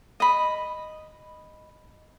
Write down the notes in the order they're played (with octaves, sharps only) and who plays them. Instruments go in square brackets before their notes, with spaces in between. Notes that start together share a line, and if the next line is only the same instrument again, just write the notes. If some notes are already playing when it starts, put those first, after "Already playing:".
[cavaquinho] D#5 B5